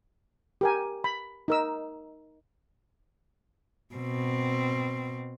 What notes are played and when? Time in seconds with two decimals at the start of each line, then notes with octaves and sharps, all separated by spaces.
0.61 G4 A#4 G#5
1.04 B5
1.48 D#4 A#4 E6
3.95 B2 C4